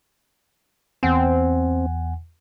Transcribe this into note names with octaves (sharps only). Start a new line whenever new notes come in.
E2 C4 F#5 G#5